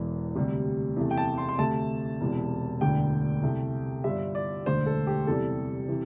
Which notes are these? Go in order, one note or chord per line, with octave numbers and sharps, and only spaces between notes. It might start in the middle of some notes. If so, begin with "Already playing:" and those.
Already playing: E1 E2 E3
D2 C3 G3
E2 C3 A3
G5
A5
C6
C6
D2 C3 A3 A5
E1 E2 C3
E1 D2 D3 G5
C2 C3 A3
G1 G2 G3 E5
D5
E1 D2 D3 C5
A4
G4
E2 C3 G3 A4
C3 E3